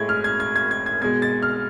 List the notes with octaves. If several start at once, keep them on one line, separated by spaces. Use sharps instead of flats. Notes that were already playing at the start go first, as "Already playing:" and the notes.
Already playing: A2 G#3 G#6
F6
G#6
G#6
G#6
G#6
G#6
B2 G#3 G#6
A6
F6